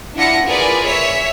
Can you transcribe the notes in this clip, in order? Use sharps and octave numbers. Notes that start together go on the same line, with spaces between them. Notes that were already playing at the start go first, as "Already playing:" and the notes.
D4 E4 F4 F#5 A#6 C#7
F4 G#4 A#4 B4 D5
C#5 E5 B6